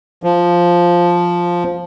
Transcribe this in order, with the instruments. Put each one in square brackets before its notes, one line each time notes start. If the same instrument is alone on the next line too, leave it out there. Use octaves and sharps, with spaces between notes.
[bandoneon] F3